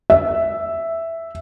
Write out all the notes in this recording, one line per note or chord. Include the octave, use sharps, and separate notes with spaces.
E5